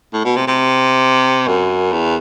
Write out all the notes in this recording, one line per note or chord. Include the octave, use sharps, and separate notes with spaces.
A2
B2
C3
C3
F#2
E2